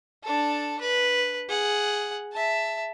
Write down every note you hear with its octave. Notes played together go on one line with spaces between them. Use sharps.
D4 A4
B4
G#4 F#5
E5 A5